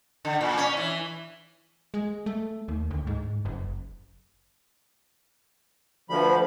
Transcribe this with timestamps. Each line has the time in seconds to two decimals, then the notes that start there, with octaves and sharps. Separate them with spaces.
0.25 D3
0.41 A#2
0.58 C#4
0.77 E3
1.94 G#3
2.26 A3
2.68 D#2
2.91 D2
3.07 G#2
3.45 F#1
6.10 D2 F3 B4 B5